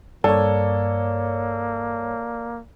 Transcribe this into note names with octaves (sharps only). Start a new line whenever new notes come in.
G2 A#3 A4 C#5 D5